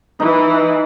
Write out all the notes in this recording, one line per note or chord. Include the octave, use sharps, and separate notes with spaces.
E3 D#4